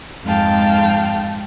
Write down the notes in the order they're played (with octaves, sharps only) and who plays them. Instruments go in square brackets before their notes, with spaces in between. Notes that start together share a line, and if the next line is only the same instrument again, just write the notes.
[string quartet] F2 G#2 G#3 F5 G5 A5